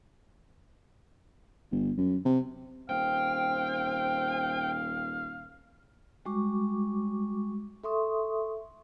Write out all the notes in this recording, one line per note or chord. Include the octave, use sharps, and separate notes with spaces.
G1
F#2
C3
D#1 C4 F5 G5
G3 G#3 F#4 C#6 D6
A4 E5 C6 C#6 D#6